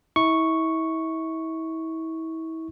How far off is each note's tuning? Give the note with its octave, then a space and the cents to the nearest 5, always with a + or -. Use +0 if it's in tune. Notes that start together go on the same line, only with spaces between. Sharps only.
E4 -35 C#6 +0